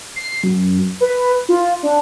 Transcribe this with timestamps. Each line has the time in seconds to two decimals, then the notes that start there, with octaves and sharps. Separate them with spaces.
0.16 C7
0.44 F#2
1.01 B4
1.49 F4
1.83 D4